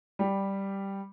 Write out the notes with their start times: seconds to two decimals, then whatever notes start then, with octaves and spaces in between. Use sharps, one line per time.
0.19 G3 G4